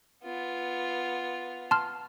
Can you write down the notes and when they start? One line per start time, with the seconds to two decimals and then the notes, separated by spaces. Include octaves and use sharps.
0.24 B3 F4
1.71 A5 C6 F6